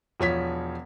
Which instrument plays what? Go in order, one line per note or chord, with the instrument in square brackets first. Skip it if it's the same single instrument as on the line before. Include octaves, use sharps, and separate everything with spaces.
[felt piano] E1 F3 C#5 B6